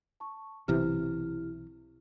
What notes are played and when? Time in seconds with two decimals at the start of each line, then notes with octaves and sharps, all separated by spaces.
0.20 A5 C#6
0.68 B1 C3 E3 E4 G4 F6